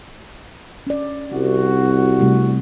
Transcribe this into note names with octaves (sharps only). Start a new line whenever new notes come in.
C#4 D5
C2 F#4
C3 G3 A3